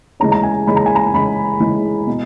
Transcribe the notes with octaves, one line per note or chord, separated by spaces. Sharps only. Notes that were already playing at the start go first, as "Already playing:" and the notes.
C#3 E3 G#3 A#5
A#5
G#5
C#3 E3 G#3 B5
A#5
G#5
A#5
C#3 E3 G#3 B5
C#3 E3 G#3
B2